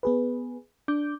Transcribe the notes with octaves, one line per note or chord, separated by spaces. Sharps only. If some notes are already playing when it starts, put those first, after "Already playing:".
B3 G#4 B4
D4 D6 G6